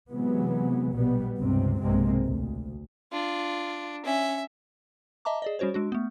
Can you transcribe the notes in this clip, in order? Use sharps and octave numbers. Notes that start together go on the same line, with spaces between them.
C3 E3 F#3 G#3 B3
A#1 B2 G3 B3
C#2 G2 C3 C4
B1 G2 C3 G#3 A#3 C4
D2
D4 F4
C#4 E5
D#5 E5 A5 A#5 D6
G#4 D5 D#5
G3 C#4 F#4 C5 C#5
G#3 D4 F#4
A3 B3